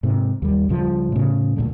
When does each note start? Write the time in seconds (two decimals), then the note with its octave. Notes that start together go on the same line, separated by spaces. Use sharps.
0.03 G#2 C3
0.42 D#2 G3
0.69 C#2 G2 F3
1.12 A2 C#3
1.56 D2 A#2 G#3 A3